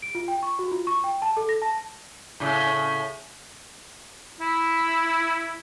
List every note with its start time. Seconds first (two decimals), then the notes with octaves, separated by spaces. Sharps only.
0.02 D7
0.15 F4
0.28 G5
0.43 C#6
0.59 F#4
0.71 F4
0.87 C#6
1.04 G5
1.22 A5
1.37 A4
1.49 A#6
1.62 A5
2.40 A2 C#3
4.40 E4